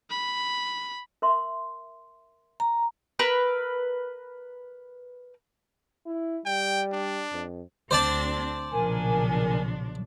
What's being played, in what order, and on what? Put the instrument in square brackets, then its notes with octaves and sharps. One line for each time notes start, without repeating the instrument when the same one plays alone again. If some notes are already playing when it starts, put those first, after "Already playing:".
[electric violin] B5
[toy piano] A#4 E5 C6
[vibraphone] A#5
[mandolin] A#4 B4 E6
[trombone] E4
[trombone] G3 [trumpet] G5
[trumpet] D4
[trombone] F2
[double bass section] D2 [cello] C4 D4 [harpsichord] C5 D5 A5
[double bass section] B1 A#2 C#3 [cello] F3 D4 [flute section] A#4 G#5